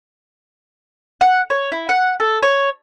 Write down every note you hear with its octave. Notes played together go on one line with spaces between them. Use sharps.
F#5
C#5
E4
F#5
A4
C#5